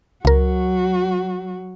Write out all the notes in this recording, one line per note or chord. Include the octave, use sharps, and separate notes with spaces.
C#2 F#3 F#4 A#4